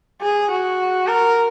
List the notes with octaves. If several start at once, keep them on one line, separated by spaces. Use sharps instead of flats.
G#4
F#4
A#4